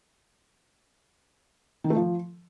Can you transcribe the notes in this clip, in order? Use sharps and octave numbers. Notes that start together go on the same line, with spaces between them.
D#3
A3
F3